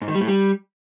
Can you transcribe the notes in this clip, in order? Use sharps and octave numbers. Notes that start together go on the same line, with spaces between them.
G#2
D#3
G3
A2
G3